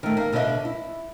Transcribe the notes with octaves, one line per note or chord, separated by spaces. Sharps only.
D#3 A3
A#3
B2 D3 A4 C#5 D#5 E5
E4